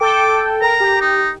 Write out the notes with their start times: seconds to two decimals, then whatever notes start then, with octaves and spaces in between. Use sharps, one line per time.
0.01 A4 G5 D6
0.62 A#4 A#5
0.80 G4
1.01 D#4